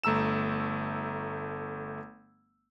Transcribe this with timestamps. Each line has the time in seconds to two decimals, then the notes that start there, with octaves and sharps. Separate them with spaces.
0.04 G1 A3 A#5 E6 E7